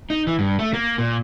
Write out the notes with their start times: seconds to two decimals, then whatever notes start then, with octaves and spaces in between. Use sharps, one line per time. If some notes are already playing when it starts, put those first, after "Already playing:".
0.10 D#4
0.27 E3
0.39 G2
0.59 A3
0.74 A#3
0.98 A#2